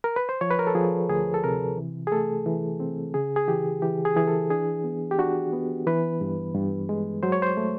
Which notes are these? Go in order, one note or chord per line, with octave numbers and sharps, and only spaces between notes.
A#4
B4
C5
F3 C#5
B4
A#4
A4
F3 G#4
D2 G#4
A4
C3 A#4
E3
G#4
A3 A4
E3
C4
C#3 G#4
G#4
E3 G4
E3 G4
G#4
E3 G#4
A4
D4 G#4
B3
G4
D4 F#4
B3
E3 B4
G2
G2
G#3
F#3 C5
C#5
C5
A3